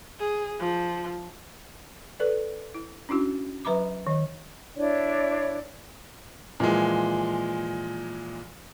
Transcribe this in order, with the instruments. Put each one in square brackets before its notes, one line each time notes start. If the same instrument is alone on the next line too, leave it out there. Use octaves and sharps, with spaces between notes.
[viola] G#4
F3
[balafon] A4 B4 D5
E4
C#4 D4 E4 F#4
F#3 B4 E5 A#5 B5 D6
D#3 D#5
[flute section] D4 E4 C#5 D5
[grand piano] A#2 E3 F3 G#3